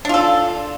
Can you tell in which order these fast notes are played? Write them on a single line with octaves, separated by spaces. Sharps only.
D4 F4 A4